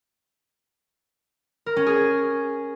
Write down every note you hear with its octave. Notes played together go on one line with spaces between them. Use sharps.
A#4
C#4
G#4